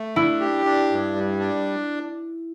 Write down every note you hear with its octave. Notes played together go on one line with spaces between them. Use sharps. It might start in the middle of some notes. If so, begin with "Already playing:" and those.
Already playing: A3
D4 E4
G4
D4
G2
G3
D4